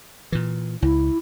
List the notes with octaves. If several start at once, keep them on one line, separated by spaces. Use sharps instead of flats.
A#2 E3
C#2 E4